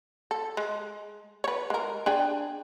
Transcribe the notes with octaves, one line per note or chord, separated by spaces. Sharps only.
A4
G#3
B4 C#5
G#3 A#4
D4 G#4 G5